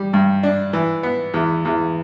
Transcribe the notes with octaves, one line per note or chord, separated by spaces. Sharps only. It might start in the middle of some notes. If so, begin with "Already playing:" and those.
Already playing: G3
G2
D4
E3
B3
E2
E2